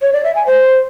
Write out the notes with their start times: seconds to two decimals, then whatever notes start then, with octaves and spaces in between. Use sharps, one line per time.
0.02 C#5
0.13 D5
0.24 E5
0.35 G#5
0.46 C5